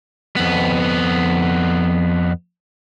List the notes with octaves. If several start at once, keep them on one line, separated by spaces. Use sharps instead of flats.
F2 B3